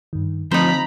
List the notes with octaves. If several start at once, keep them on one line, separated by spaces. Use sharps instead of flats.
G2 D#3
D3 F3 A3 C4 D#4 C5 A#5 B5